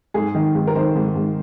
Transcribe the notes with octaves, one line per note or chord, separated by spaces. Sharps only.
G#2 G#4
D#3
G#2
A#4
D#3 C5
G#2
G#2